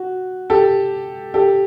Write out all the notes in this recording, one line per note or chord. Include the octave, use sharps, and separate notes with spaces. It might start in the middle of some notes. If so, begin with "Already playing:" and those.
Already playing: F#4
G4 A4
G4 A4